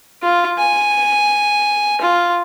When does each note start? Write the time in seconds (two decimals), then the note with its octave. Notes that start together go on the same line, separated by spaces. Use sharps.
0.23 F4
0.58 G#5
2.01 F4